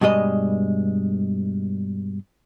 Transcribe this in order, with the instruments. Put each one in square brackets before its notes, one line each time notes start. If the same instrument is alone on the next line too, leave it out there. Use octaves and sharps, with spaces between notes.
[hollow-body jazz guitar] G2 B2 G3 G#3 D#5